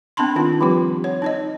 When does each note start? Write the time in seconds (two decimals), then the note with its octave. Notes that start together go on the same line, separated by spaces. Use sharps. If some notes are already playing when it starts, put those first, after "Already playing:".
0.17 B3 C4 D4 A5 B5 C6
0.35 D#3 C4 D#4 F4
0.61 F3 G3 C4 F4 G4
1.04 C#5
1.22 D#4 C#5 D#5